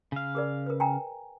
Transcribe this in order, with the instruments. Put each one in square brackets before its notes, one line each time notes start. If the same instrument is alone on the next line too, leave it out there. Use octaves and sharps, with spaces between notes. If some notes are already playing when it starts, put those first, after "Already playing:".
[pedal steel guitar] C#3 F5
[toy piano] G#4 A#4 D5
A#4 B4
G5 G#5 A#5